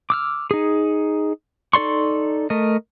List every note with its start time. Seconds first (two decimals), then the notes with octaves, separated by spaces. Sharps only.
0.10 D6 E6 F6
0.51 D#4 G#4
1.73 D#4 A4 D5 C6 C#6
2.50 A3 A#4 D#5